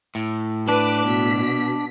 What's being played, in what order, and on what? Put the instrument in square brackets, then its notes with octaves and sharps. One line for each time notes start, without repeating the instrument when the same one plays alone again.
[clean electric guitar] A2
[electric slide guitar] D4 [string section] B4 D6
[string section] B2 B6